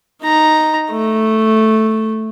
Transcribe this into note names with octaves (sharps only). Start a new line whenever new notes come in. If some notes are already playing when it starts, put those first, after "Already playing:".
D#4 A#5
A3